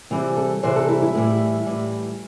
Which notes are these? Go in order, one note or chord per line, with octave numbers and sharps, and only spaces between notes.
C3 E3 G3 C4
A4
C3 E3 G3 C5
A4
E4
E4
A2 E3 G3
A2 E3 G3